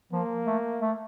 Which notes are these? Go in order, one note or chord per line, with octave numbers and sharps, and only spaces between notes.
F3 A#3
A3
A3